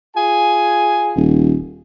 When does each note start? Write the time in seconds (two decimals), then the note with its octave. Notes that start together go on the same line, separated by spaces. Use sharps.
0.15 F4 G#4 G#5
1.16 D#1